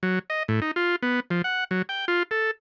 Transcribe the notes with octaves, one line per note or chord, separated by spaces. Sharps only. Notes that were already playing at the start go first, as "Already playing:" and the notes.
F#3
D#5
A2
D#4
F4
B3
F3
F#5
F#3
G5
F4
A4